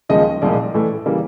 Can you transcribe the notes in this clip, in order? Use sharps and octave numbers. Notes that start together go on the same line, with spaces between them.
D#2 C#3 F3 G#3 D#5
C2 A#2 F3 G#3 D5
A2 E3 A3
C#3 E3 G3 A#3